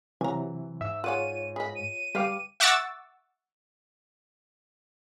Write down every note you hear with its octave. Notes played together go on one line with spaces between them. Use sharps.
C3 E3 F#3 G#5 A#5
G#2 E5 E6
F4 G#4 C#5 D5 F#5 D#7
G#4 D#5 B5
D#7
G3 B4 F5 G5 D6
E5 F#5 C#6 D6 E6 A6